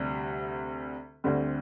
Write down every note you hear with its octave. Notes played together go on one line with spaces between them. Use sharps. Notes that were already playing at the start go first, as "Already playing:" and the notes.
Already playing: D2 C3 G3
D2 D3 G3 C4